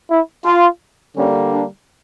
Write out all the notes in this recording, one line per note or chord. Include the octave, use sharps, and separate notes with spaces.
E4
F4
D3 G3 A#3 C#4
D4